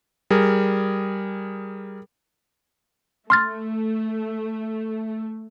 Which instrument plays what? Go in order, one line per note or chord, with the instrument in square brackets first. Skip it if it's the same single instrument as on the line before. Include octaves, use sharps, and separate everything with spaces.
[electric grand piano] G3 G#4 A#4
[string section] A3 [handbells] C6 F6 A6